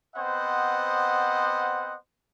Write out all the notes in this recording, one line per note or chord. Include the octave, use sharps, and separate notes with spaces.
B3 C4 C5 D#5 F#5